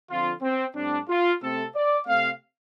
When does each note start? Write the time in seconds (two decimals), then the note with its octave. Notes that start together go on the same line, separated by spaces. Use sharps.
0.09 D3 F3 C4 F4
0.42 C4
0.75 A2 G3 C4 D4
1.08 F4
1.41 C3 A3 C4 A4
1.74 D5
2.06 C3 A3 C4 F5